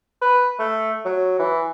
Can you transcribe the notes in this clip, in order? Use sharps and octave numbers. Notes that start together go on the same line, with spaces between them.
B4
A3
F#3
E3